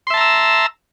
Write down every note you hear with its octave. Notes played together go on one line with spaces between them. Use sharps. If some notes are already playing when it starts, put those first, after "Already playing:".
E5 A5 A#5 C6 E6